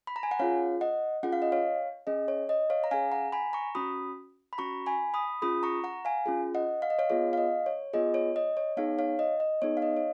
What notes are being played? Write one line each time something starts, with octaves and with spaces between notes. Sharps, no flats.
B5
A#5
G#5
F#5
C#4 F4 G#4 C#5 F5
D#5 F#5
C#4 F4 G#4 F#5
F5
D#5
C#5 F5
C#4 G#4 D#5
C#5
D#5
C#5 F5
A#5
C#4 G#4 F5 G#5
F#5 A#5
G#5 B5
A#5 C#6
C#4 F#4 B5 D#6
B5
C#4 F#4 A#5 C#6
G#5 B5
B5 D#6
C#4 F4 G#4 B5 D#6
A#5 C#6
F#5 A#5
F5 G#5
C#4 F4 G#4
D#5 F#5
F5
D#5
C#5 F5
B3 F4 G#4 C#5
F5
D#5
C#5
B3 F4 G#4 D#5
C#5
D#5
C#5
B3 D#4 G#4 C#5 F5
C#5 F5
D#5
D#5
B3 D#4 G#4 C#5
F5
D#5
C#5